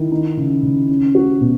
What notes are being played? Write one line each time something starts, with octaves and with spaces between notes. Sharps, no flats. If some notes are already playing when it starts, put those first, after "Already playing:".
Already playing: D#3 E4
D#4
C#3
C#3
C#4
F#4
B2